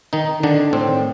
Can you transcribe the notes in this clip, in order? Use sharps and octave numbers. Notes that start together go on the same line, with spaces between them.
D#3 D#4
D3 D#3 D4
A2 C4